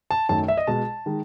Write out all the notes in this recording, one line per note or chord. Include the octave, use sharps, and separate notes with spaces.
A5
F#2 D#3 F#3 A3 A5
E5
D#5
B2 G#3 A5
D#3 G#3